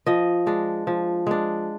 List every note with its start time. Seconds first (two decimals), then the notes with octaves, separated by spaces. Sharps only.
0.07 F3 D#5
0.47 G#3 D4
0.87 F3
1.27 G#3 D4